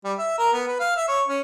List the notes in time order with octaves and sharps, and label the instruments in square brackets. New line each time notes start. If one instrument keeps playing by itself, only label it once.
[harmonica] G3
E5
A#4
B3
B4
F5
E5
C#5
C#4